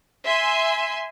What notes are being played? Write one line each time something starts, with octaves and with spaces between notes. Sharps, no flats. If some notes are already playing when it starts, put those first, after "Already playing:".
E5 G#5 C6